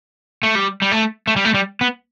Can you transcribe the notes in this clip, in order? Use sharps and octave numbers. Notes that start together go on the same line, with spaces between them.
A3
G3
G3
A3
A3
G3
A3
G3
B3